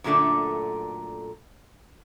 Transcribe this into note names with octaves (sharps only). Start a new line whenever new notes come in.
F#2 A#2 D3 A3 D4